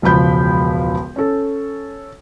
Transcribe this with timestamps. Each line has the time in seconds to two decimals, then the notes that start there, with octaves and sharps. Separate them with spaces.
0.02 E1 C#2 F3 B5 G6
1.16 C#4 A4